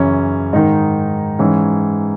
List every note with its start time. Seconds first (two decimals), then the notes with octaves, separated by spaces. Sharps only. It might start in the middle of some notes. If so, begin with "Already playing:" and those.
Already playing: F#2 C#3 E3 C#4
0.53 G#2 D#3 D#4
1.39 G#2 E3 C#4